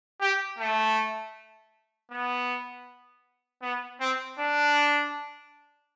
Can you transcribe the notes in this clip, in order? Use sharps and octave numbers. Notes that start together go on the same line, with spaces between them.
G4
A3
B3
B3
C4
D4